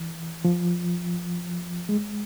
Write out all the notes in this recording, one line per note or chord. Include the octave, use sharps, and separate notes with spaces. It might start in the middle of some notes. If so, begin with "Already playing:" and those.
Already playing: E3
F3
G#3